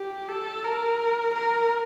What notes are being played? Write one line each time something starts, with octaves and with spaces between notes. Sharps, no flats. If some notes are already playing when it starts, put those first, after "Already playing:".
Already playing: G4
A4
A#4
A#4